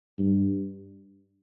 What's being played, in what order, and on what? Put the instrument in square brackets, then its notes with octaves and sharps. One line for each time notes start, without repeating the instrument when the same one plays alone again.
[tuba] G2